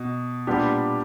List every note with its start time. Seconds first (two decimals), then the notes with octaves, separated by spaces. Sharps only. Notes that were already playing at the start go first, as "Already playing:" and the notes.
Already playing: B2
0.47 A#2 G3 B3 D4 G4